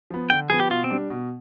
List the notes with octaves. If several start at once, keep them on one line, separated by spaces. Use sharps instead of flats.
F3 B3
D3 G5
F3 B3 G#4
G4
B2 F4
C4
G3 D4
B2